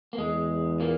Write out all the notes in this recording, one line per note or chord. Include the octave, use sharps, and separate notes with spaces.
A#3
E2 G#3
A#2 A#3